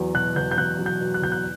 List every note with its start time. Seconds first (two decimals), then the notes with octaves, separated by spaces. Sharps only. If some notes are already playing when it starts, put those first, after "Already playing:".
Already playing: E2 F#3
0.14 B2 F#6
0.36 E2 G6
0.51 G6
0.58 E2 F#6
0.79 F#3
0.86 G6
1.01 B2
1.14 F#6
1.22 E2 G6
1.32 F#6